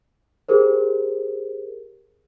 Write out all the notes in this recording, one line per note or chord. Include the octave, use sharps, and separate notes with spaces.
G4 G#4 A#4 C5